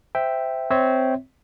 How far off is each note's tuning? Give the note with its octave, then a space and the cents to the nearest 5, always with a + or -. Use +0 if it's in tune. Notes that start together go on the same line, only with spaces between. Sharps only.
C5 -15 E5 +0 G5 +0
C4 -10 C#5 +0 E5 -20